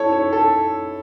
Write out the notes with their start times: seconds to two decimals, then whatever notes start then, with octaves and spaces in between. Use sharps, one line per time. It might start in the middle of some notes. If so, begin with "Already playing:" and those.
Already playing: E4 A4 C#5
0.13 C#5
0.33 A4